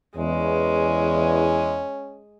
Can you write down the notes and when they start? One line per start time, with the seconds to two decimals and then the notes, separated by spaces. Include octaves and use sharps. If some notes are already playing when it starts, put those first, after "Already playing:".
0.17 E2 G#3 C#4